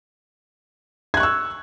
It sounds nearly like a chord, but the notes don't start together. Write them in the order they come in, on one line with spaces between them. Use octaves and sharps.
G#6 F#6 C#6 E6